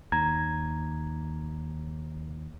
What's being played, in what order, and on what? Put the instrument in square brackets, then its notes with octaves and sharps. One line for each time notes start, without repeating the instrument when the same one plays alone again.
[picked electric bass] D#2 [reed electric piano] A#5 G#6